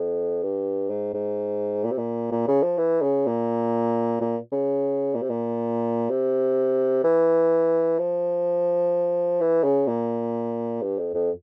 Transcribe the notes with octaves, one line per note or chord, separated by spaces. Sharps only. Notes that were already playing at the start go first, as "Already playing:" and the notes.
Already playing: F2
G2
G#2
G#2
A#2
C3
A#2
A#2
C#3
F3
E3
C#3
A#2
A#2
C#3
A#2
C3
A#2
C3
E3
F3
E3
C#3
A#2
G2
F2
F2